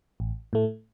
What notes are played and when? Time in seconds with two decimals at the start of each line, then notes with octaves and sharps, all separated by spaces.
0.20 A1
0.53 A2 A3